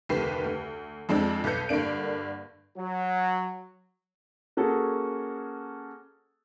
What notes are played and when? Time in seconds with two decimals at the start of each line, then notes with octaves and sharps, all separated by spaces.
0.09 F1 D2 D#3 G4 B4 C7
0.44 D2
1.09 F2 G#3 C4 D4
1.44 B1 A4 B4 G6 C#7
1.69 G2 D3 A#3 D4 D7
2.76 F#3
4.57 A#3 C#4 F#4 G#4 A4